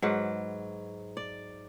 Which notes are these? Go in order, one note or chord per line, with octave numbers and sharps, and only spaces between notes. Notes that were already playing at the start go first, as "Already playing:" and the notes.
G#2 F#3 B4
D5